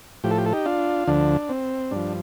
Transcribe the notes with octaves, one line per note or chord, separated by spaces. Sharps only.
A2 F3 G4
A4
G4
A4
D#4 G4
D4 F4
D2 D3 F3 D4
C4
G2 F3 D4